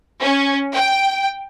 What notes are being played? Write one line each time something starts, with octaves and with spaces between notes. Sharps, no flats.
C#4
G5